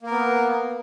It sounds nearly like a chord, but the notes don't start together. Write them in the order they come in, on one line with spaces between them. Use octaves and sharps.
A#3 A#4 B3